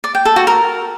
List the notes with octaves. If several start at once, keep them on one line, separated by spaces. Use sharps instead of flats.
D5
G5
A4
F#4
A#4